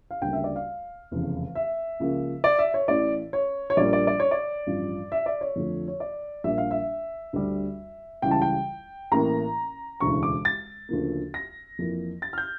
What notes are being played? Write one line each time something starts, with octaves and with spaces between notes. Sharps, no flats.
F5
D2 C#3 G3 A#3 G5
E5
D5
F5
F1 E2 C#3
E5
C#2 C#3 F3 A#3
D5
E5
C#5
A1 A2 E3 D5
C#5
C#5
A#1 A#2 G3 A#3 D5
D5
D5
C#5
D5
A1 G2 F3
E5
D5
C#5
F2 D3 F3 A3
C#5
D5
A#1 A#2 G3 A#3 E5
F5
E5
D2 D3 G3
C#2 C#3 E3 G3 G5
A5
G5
A1 A2 E3 A#3 A#5
E1 D2 C#3 E3 C#6
D6
A6
D2 C#3 F3 A#3
A#6
F2 E3 A#3
A6
F6
G6